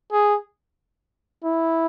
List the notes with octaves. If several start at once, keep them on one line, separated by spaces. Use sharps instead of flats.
G#4
E4